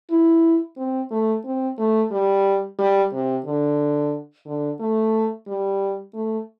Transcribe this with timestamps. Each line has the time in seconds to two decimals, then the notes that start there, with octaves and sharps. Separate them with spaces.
0.11 E4
0.77 C4
1.11 A3
1.45 C4
1.78 A3
2.11 G3
2.79 G3
3.13 C3
3.46 D3
4.46 D3
4.80 A3
5.47 G3
6.14 A3